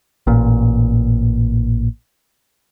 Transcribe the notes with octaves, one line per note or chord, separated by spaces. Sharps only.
A1 A#2